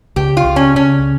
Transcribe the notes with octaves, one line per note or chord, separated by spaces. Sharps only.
C#2 G4
F4
C#2
C#4
C#3 C#4